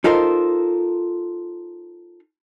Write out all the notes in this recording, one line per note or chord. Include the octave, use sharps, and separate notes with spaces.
D#4 F4 A4 A#4 C5